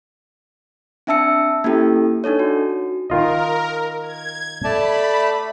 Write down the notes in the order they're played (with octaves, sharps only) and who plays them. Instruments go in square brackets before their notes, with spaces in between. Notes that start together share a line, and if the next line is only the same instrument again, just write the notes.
[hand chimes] C4 D4 E5 A5 E6 C#7
A#3 C#4 E4 G4 A4
D4 D#4 A4 C#5
F#4
[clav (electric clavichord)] D#3 F4 D#5 [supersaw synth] A#4
[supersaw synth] G#6
[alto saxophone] A3 [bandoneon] D5 A5 [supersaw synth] B5